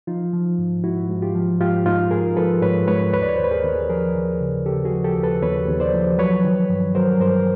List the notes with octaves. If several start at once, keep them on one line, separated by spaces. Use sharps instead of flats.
F3 D#4 F4
F3
G#2
G#2 E4 F#4
G#2
F4 G4
F3
G#2 F4 G4
G#2 D#4 F4
G#2 G#4 A#4
F3 A4 B4
G#2 B4 C#5
G#2 B4 C#5
D#2 B4 C#5
D5
C#5
C5
D#2 B4
G#4 A#4
D#2
F3 G#4 A#4
D#2
C#3
C#3 G4 A4
F#4 G#4
F3
G4 A4
D#2
A4 B4
D#2 B4 C#5
D#2
C5 D5
F3
F#3 B4 C#5
D#3
G2
F#3 A#4 C5
G2 A#4 C5